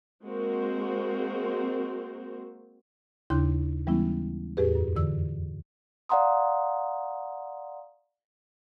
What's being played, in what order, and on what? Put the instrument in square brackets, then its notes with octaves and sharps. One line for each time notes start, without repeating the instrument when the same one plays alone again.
[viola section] G#3 A#3 C4 F#4 A#4 C5
[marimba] D#2 C#3 D4 E4 C6 G6
E3 G3 G#3 B3 C#4 E4
E2 A2 G4 G#4 B4
F#2
F2 D3 E3 E6
[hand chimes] D5 F5 F#5 A#5 C6 D#6